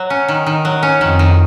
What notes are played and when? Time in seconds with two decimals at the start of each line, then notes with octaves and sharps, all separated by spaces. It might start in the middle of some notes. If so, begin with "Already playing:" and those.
Already playing: F#3
0.10 C#4
0.28 D#3
0.47 D#3
0.65 F#3
0.83 C#4
1.01 F2 D#3
1.19 D#3